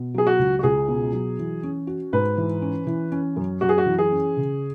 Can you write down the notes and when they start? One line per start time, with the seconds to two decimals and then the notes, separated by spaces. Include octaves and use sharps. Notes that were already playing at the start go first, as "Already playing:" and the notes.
Already playing: B2
0.14 F#3 G#4
0.27 F#4
0.39 C#2
0.59 F#4
0.63 C#2 G#4
0.88 B2
1.13 F#3
1.39 E3
1.63 C#4
1.87 F#4
2.13 G#2 B4
2.37 E3
2.62 C#4
2.87 E3
3.12 C#4
3.36 F#2
3.61 F#2 F#4
3.69 G#4
3.78 F#4
3.86 E3
3.98 G#4
4.12 C#4
4.37 C#3